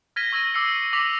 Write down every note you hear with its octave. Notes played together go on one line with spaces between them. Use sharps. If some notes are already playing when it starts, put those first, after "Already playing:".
F6 G#6 A#6 B6 D#7 G7
C#6 E6 G#6 A#6 D#7
D6 E6 C7 C#7
D6 A#6 B6 F7 F#7